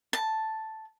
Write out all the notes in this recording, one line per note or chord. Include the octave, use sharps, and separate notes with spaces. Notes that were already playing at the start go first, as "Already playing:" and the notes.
A5